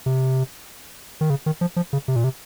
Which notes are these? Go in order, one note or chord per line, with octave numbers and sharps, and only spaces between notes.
C3
D#3
C#3
D#3
F3
F3
C#3
C3
A#2
C3